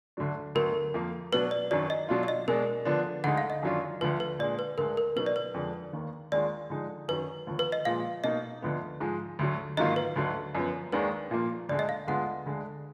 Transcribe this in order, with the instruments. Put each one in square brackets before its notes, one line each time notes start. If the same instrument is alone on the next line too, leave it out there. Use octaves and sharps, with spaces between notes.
[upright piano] D2 D3 F#3 D4
[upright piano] D2 D3 F#3 B3 [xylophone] A#4
[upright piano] F2 F3 A#3
[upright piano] B2 F#3 B3 D4 [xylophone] B4
[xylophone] D5
[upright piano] F#2 D#3 F#3 D4 [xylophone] D5
[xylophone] D#5
[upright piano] B2 F#3 D4 F4
[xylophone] D5
D#5
[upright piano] B2 G#3 D4 [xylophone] A#4
[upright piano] D3 F3 B3 D4
[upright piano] D2 D3 G#3 D#4 [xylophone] F#5
[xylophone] F5
D#5
[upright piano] F#2 D#3 F#3 D4 F4
[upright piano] D2 D3 F3 [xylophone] B4
[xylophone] B4
[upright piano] A#2 G#3 D4 [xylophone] D5
[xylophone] B4
[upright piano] D2 D3 G#3 [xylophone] A#4
[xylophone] A#4
[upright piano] B2 F#3 B3 D#4 [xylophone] B4
[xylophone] D5
B4
[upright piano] F2 D3 G#3 D4
D#2 D#3 A#3
[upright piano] D#2 D#3 G#3 D4 F4 [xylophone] D5
[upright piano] D3 F3 G#3 D#4
[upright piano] F#2 D#3 F#3 [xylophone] B4
[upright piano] D#2 D3 F3
[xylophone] B4
D#5
[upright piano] A#2 F3 G#3 [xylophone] F5
[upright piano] B2 A#3 D#4 [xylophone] D#5
[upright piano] D2 D3 F3 B3
G#2 F3 G#3
D2 D3 F#3
[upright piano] G#2 D#3 F#3 A#3 F4 [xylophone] D#5
[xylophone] B4
[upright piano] D2 D3 F#3
F#2 F3 B3
[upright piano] D#2 D#3 G#3 D4 [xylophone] B4
[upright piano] A#2 F3 A#3
[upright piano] D2 D3 G#3 [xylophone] D5
[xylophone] D#5
F5
[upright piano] D2 D3 G#3 B3 F4 [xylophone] F#5
[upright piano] D2 D3 G#3